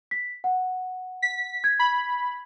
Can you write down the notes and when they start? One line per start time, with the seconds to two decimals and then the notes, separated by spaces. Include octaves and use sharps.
0.11 B6
0.44 F#5
1.22 B6
1.64 G#6
1.79 B5